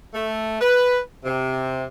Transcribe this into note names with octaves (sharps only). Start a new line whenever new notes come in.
A3
B4
C3